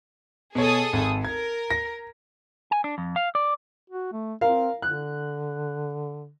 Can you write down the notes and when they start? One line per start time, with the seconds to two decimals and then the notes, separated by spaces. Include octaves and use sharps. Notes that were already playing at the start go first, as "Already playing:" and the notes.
0.55 B2 G#4 A4 C#5 D#6
0.93 G#1
1.25 A#4 G#6
1.71 A#6
2.71 G#5
2.84 D4
2.98 F2
3.16 F5
3.35 D5
3.90 F#4
4.12 A3
4.41 C4 A#4 F5
4.82 D3 F#6